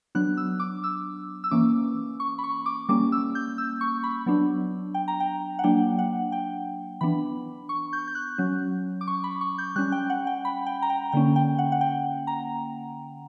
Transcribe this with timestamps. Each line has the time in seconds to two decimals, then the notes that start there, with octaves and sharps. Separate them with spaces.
0.15 F#3 B3 D4 F#6
0.37 E6
0.60 D6
0.84 E6
1.44 E6
1.51 E3 A#3 C#4 D6
2.20 C#6
2.38 B5
2.44 C#6
2.66 D6
2.89 G3 A#3 C#4 D6
3.12 E6
3.35 G6
3.58 E6
3.81 C#6
4.04 B5
4.26 F#3 B3 D4
4.94 G5
5.08 A#5
5.20 G5
5.59 F#5
5.64 F#3 A#3 D4 G5
5.99 F#5
6.32 G5
7.01 E3 B3 D4 B5
7.69 C#6
7.93 G6
8.07 G6
8.15 F#6
8.38 F#3 C#4
9.01 D6
9.07 C#6
9.24 B5
9.41 C#6
9.58 G6
9.76 G3 C#4 F#6
9.92 G5
10.10 F#5
10.27 G5
10.45 B5
10.67 G5
10.82 A#5
10.90 G5
11.12 D3 A#3 C#4 G5
11.36 G5
11.59 F#5
11.72 F#5
11.81 G5
12.27 A#5